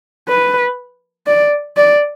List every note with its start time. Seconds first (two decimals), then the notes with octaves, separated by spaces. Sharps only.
0.29 B4
1.27 D5
1.77 D5